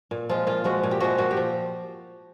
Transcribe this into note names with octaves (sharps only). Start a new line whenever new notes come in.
A#2
F3 G#3 F4
A#2 F4
F3 G#3 F#4
A#2
G4
F3 G#3 F#4
A#2 F#4
G4
F3